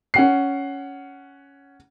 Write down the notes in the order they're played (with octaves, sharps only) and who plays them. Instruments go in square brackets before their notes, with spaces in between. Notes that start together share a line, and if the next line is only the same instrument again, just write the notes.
[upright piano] C#4 F#5 C7